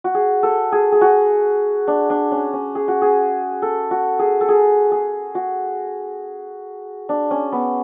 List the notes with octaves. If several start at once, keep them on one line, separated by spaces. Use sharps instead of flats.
F#4
G#4
A4
G#4
G#4
F#4
D4
D4
C#4
C#4
G#4
F#4
G#4
A4
F#4
G#4
A4
G#4
G#4
F#4
D4
C#4
B3